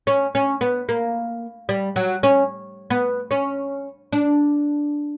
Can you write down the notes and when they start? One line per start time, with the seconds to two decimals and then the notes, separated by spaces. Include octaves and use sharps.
0.07 C#4
0.35 C#4
0.61 B3
0.89 A#3
1.69 G3
1.96 F#3
2.23 C#4
2.90 B3
3.31 C#4
4.13 D4